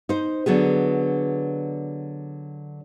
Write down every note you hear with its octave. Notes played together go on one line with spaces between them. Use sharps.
D#4 C5
D3 F#3 B3 G#4